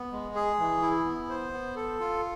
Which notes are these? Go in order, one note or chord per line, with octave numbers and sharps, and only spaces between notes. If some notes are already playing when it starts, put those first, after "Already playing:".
Already playing: B3
G#3
G#4
E3
E4
B3
C5
B3
A4
F4